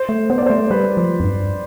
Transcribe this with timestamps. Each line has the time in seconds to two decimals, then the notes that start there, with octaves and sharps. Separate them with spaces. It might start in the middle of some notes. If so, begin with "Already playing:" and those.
Already playing: C5
0.09 A3
0.30 B3 C5
0.38 D5
0.42 B3
0.46 C5
0.50 A3
0.71 G3 B4
0.97 F3
1.20 F2
1.24 G2